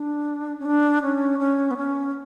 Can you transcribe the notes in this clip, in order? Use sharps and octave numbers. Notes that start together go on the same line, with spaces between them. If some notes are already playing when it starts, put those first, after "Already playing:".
Already playing: D4
C#4
D4
C#4
C#4
B3
C#4